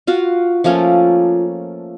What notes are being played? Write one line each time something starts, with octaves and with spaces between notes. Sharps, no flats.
F4 F#4 F5
F3 A3 A#3 C#4